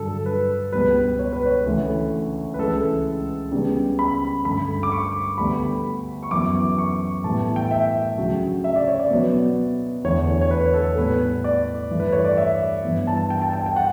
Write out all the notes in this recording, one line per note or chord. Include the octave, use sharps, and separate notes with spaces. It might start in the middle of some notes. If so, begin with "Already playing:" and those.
Already playing: G2 D3 F#3 A4
B4
C#2 B2 G3 B4
C#5
B4
C#5
D2 C#3 E3 A3
B4
C#2 C#3 E3 A3 A4
C#2 C#3 G3 B3
B5
G2 D3 A3 B5
D6
C#6
D2 D3 G3 B3 B5
C#6
F#2 E3 B3 D6
C#6
A2 E3 G3 B3 A5
G5
E5
D2 C#3 F#3
E5
D5
C#5
D5
B2 F#3 B3
E2 D3 A3 C#5
C#5
B4
A4
A2 G3 B3 B4
D5
G2 E3 A3
B4
C#5
D5
E5
G2 E3 B3
A5
G5
A5
G5
G5
F#5